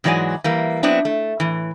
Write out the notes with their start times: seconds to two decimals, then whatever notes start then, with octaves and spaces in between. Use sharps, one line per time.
0.04 G#2 E3 F#3 G#3 D5 G#5
0.44 E3 G3 A#3
0.83 F#3 B3 C4 D4 E4
1.05 A3
1.40 A2 E3